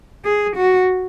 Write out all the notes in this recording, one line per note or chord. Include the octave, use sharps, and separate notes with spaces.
G#4
F#4